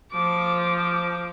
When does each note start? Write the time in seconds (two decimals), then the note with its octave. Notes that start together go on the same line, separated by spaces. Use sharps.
0.12 F3 D6